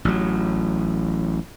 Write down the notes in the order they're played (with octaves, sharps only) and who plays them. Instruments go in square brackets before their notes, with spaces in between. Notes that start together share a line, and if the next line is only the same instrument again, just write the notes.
[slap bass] A1 F#3